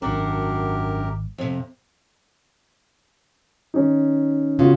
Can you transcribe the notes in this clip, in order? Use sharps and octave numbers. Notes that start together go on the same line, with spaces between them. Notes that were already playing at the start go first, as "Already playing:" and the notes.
G#1 F#2 G#3 D4 F#4 G4 A#4
F2 C3
D#3 C#4 D#4
C#3 B3 F4 F#4